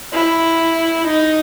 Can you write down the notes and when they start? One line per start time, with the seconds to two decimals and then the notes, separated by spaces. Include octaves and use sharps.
0.13 E4
1.07 D#4